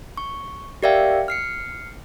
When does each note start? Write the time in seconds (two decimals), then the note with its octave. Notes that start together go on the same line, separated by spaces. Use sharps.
0.17 C#6
0.83 G4 A#4 D5 E5 F5 G5
1.28 F6 C7 C#7